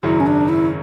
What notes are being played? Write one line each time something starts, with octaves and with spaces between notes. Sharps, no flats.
G#1 F#2 C#3 F#3 E4
C#4
D4
E4